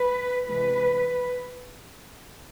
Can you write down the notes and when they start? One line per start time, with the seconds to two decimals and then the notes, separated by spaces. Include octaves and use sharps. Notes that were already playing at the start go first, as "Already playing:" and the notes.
Already playing: B4
0.47 C3 E3 G#3 B4